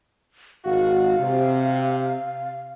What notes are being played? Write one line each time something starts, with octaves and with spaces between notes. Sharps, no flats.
G#1 F#4 F5
C3